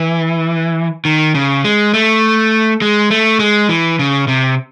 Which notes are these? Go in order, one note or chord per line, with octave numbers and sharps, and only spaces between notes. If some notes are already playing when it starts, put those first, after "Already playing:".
Already playing: E3
D#3
C#3
G#3
A3
G#3
A3
G#3
E3
C#3
C3